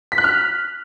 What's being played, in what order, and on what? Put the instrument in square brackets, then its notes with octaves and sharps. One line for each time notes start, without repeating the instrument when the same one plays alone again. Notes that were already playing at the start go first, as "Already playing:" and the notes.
[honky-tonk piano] B6
F#6
F6